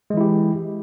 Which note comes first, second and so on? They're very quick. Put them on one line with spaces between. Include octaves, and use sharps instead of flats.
G#3 E3 E4 G4